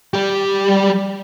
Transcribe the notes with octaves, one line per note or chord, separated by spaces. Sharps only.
G3 G4